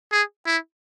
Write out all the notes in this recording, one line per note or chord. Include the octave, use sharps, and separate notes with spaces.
G#4
E4